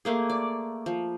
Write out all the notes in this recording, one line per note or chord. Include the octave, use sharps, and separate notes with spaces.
A3 A#3 G#4
D5
F3